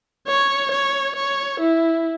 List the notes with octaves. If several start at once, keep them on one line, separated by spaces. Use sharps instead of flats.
C#5
C#5
C#5
E4